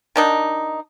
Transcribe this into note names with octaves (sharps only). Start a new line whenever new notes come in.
D#3 D4 D#4